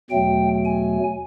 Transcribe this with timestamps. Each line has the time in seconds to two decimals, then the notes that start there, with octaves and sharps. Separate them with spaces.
0.10 E2 B2 F#3 A3 G5
0.65 G#5